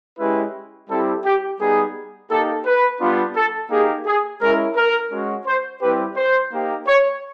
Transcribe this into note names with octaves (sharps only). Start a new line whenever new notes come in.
G#3 C#4 E4 G4 B4
G3 C4 E4 G4 A4
G4
G3 B3 D#4 G#4
A#3 D#4 G4 A4
B4
G3 B3 D4 F4
A4
A#3 D#4 G4 G#4
G#4
G#3 C#4 E4 A#4
A#4
G#3 C#4 F#4
C5
G3 C4 E4 G4 B4
C5
A#3 D#4 G4
C#5